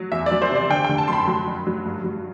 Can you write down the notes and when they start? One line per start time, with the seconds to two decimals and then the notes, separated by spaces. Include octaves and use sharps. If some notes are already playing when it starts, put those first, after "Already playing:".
Already playing: F#3
0.12 E2 E5
0.26 D5
0.31 F#3
0.42 C5
0.51 C3 D5
0.69 D3 G5
0.85 D3 G5
0.98 A5
1.08 F#2 B5 C6
1.27 F#3
1.48 F#2
1.67 F#3
1.86 G2
2.04 F#3